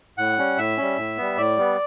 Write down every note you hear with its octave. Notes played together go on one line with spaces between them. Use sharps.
A2 F#5
G3 C#4
A2 E5
G3 C#4
A2
G3 B3
A2 D5
G3 B3